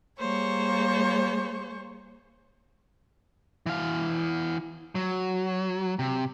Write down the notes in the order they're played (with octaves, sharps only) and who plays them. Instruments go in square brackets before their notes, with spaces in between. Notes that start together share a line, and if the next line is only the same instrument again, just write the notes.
[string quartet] G3 A#3 G#4 C5 C#5 C#6
[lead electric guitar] E3 F5
F#3
C3